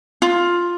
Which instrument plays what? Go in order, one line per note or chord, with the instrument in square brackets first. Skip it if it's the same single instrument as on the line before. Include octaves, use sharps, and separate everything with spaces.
[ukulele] F4